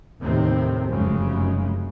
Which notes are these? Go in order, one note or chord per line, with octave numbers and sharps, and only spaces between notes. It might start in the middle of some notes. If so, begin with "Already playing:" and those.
D#2 A2 C3 D#3 C4
F1 F#2 C#3 G#3